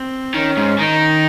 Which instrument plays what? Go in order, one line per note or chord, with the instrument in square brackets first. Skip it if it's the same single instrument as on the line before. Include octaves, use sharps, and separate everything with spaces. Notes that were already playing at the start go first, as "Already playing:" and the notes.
Already playing: [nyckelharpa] C4
[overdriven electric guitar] D#3 [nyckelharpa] C#4
[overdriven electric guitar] G#2
[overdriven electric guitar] D#3 [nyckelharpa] D#4